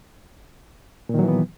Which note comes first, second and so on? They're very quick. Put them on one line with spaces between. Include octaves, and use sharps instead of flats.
A#2 D#3 F#3 E3 B3